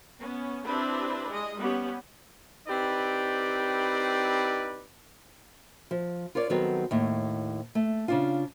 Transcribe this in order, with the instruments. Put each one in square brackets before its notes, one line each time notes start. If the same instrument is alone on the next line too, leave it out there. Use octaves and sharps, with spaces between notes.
[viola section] B3 C#4
C4 D4 E4 G4 B4
G#3 D#5
G3 B3 C#4 G4
[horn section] C4 D#4 E4 G4 B4 D5
[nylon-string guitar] F3
F4 A#4 C#5 D5
D#3 F#3 G3 B3 C4 A4
D#2 A2
A3
C#3 D4 F4